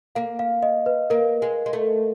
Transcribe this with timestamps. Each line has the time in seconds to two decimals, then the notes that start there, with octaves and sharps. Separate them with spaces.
0.15 A#3 F5
0.39 F5
0.63 D#5
0.86 B4
1.10 A#3 A#4
1.42 G#3
1.66 G#3
1.73 A3